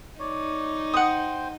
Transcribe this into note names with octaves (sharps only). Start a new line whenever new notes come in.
D#4 C#5 D5
C5 F#5 G5 D#6